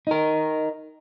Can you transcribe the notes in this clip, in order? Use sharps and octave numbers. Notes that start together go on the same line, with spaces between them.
D#4 A#4